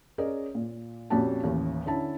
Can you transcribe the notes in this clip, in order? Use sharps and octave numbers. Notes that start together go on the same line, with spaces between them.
C#4 G#4 A#4 D5 D#5
A#2
F2 A#2 C#4 F#4 G4 A5
A1 D#2
D3 C#4 E4 A5